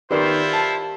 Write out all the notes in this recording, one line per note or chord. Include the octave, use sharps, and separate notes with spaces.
D#3 B3 E4 F4 G4 A#4 C5 D5
A5